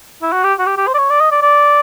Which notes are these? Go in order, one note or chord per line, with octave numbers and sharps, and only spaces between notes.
E4
F#4
G4
F#4
G4
G4
C5
D5
C#5
D5
D#5
D5
D5